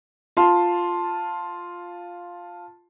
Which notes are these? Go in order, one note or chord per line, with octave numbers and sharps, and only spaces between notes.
F4 A5 C6